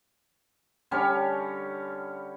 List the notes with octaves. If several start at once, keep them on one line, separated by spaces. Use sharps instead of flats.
D3 G3 C#4 C#5